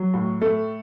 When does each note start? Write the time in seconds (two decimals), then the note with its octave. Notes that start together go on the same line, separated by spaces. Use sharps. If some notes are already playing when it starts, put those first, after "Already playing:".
Already playing: F#3
0.14 A2
0.41 A3 A4